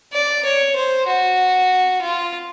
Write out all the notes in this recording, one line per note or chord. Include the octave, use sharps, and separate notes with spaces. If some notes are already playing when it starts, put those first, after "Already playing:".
D5
C#5
C5
F#4
F4